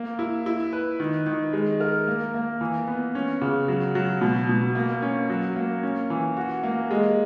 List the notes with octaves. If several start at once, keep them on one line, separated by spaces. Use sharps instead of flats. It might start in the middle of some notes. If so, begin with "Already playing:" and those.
Already playing: A#3
E4
E4
B4
D#3
D#3
G#3
A#4
A#3
A#3
E3
B3
C#4
C#3
F#3
F#3
B2
B2
A#3
C#4
F#3
A#3
C#4
E3
F#4
A#3
G#3